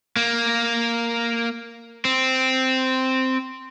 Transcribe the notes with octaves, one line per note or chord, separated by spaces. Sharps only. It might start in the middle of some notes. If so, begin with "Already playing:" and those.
A#3
C4